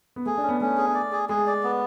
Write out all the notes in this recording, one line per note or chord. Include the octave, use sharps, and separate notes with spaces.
B3
A3 G#4
D4
C#4
B3
A3 C#4
G#4
D5
G#4
G#3 G#4
D5
B3